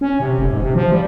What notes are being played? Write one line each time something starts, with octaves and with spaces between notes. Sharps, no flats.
C#4
C3
F1
G#2
C3
F3
G3